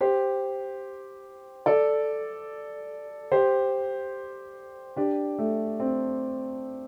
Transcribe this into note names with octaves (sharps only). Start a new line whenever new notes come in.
G4 C5
A4 D5
G4 C5
D4 G4
A3
C4